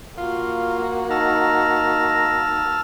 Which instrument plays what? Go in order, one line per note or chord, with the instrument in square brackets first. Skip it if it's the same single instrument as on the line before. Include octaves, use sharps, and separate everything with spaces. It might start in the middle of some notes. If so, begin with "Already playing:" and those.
[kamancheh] A#3 F#4 [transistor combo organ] F4
[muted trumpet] D#4 [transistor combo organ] A5 E6 F6 [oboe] A#5